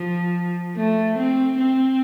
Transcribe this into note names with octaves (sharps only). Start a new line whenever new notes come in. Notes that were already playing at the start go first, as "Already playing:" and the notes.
Already playing: F3
A3
C4
C4